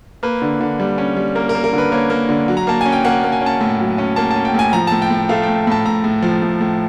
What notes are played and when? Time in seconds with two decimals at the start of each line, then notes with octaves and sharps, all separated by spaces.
0.23 A#3 B4
0.42 D3
0.60 D3
0.80 G3
0.98 C#4
1.17 G3
1.35 A#3 A#4
1.49 A#4
1.55 A#3
1.64 A#4
1.73 D3
1.78 B4
1.92 A#3 C#5
2.10 A#3
2.29 D3
2.48 F#3
2.57 A#5
2.67 A#3 A5
2.81 C#4 G#5
2.92 G5
3.05 A#3 F#5
3.23 A#3
3.32 G#5
3.41 C#4 A5
3.61 A2
3.79 F#3
3.98 C#4
4.16 A#3 A5
4.30 A5
4.36 C#4
4.45 G5
4.54 A2 G#5
4.73 F3 A#5
4.87 A2 A5
5.02 G5
5.10 A2
5.29 A3 F5
5.43 A2 G5
5.67 A2 A5
5.86 A2 A#5
6.04 A2
6.22 F3
6.42 A2
6.61 A2